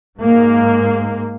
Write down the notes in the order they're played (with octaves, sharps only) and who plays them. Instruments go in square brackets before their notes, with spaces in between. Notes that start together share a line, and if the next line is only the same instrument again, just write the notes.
[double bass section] G#2 A#3